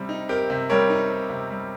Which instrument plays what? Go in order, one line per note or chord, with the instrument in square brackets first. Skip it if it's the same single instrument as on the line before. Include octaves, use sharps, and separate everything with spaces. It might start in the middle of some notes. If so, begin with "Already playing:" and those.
Already playing: [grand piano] C3 G3 C4
D#4
C4 G4 A#4
C3
G3 A#4 C#5
D#4
C4
C3
G3